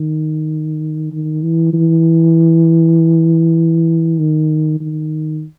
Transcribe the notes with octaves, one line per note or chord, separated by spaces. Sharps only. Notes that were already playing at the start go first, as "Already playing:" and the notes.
Already playing: D#3
D#3
E3
E3
D#3
D#3